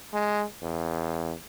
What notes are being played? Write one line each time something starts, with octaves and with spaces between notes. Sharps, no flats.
G#3
E2